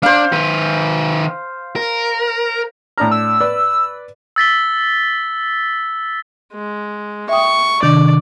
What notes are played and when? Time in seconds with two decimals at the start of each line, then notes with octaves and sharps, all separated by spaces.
0.03 D4 C5 F5
0.33 D#3 B4
1.76 A#4
2.98 A2 D4 A#5 F6
3.12 E6
3.40 B4 D5
4.36 E6 A6 B6 G7
6.53 G#3
7.29 E5 G5 C#6 D#6
7.83 C3 D#3 D4 D5